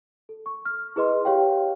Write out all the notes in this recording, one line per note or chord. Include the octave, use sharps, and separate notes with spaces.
A4
C#6
F6
E4 G#4 B4 D#5 C6
G4 C#5 F5 G5